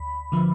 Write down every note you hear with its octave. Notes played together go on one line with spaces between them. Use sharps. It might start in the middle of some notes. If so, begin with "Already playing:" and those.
Already playing: D2 B5
D3 F3